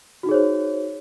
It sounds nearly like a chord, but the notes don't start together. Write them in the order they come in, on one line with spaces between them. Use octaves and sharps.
F#4 D#4 G#4 C#5 C5